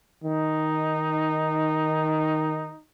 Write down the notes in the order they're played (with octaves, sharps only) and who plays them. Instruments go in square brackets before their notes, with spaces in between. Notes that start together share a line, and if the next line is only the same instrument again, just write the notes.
[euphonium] D#3 [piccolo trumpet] D#4